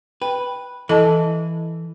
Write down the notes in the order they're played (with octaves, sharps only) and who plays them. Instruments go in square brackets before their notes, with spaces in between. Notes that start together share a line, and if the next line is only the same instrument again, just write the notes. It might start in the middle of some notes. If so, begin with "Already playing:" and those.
[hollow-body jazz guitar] B4 [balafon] G5
[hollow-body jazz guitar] E3 [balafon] A4 D#5 A5